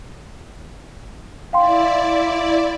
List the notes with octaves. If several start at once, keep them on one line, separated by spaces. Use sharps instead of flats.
E4 D5 F5 G5 C6